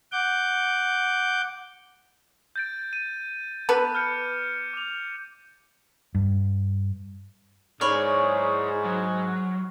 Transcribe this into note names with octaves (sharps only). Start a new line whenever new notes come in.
F#5 D6 G6
G6 A6 D7
D#7
B3 A4 B4 D6
F6 G6 C#7
D6 F7
G2
G#2 E4 C#5 D5 B5 C#6 F6
F#3